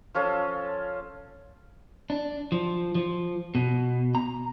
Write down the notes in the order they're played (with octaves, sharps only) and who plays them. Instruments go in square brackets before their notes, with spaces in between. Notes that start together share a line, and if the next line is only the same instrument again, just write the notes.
[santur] F3 C#4 F4 A4
[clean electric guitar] D4
F3
F3
B2
A#5